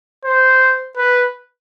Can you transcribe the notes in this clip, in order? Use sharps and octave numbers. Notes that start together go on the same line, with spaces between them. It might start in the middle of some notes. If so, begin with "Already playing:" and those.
C5
B4